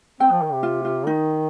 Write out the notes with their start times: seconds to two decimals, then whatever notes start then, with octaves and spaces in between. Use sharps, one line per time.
0.20 C4 G5
0.31 F3
0.42 D#3
0.53 C3
0.63 F4
0.85 F4
1.06 D#3 D#4